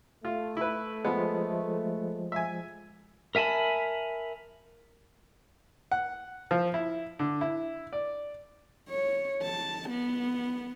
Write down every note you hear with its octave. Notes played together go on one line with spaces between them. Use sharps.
A3 F4
E4 B4
F3 G#3 B3
E5 G#5
A#4 E5 G#5 A5 B5
F#5
F3
E4
D3
E4
D5
C#5
A5
B3